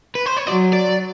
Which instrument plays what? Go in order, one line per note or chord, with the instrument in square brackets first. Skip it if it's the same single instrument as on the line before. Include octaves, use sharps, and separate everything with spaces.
[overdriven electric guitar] B4
C5
C#5
[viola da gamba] F#3 [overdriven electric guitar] D5
[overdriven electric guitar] D5